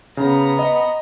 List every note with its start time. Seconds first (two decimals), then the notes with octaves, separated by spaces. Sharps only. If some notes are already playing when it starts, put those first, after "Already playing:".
0.17 C#3 B3 A#5
0.59 D#5